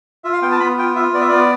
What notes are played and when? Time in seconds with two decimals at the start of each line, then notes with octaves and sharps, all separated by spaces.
0.24 F4 E5
0.33 F5
0.42 B3 G5
0.52 A5
0.60 B3 B5
0.78 F4 G5
0.96 F4 E5
1.13 B3 D5
1.21 E5
1.29 B3 D5